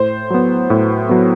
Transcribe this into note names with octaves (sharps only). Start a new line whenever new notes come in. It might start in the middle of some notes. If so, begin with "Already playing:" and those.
Already playing: A2 C5
F#3 B3
A2
F#3 B3